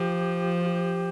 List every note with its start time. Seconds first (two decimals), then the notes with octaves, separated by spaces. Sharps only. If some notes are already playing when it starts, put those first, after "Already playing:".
Already playing: F3 G4
0.60 F4
0.66 G4